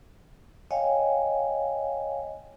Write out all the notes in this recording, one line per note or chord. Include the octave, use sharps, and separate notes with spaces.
C#5 D#5 F5 G5 G#5